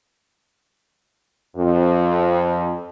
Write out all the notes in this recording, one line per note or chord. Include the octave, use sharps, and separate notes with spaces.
F2